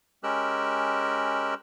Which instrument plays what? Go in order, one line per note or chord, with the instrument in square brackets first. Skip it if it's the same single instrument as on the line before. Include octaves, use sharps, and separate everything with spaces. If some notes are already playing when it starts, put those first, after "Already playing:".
[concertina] G#3 C#4 G4 A#4 E6 F#6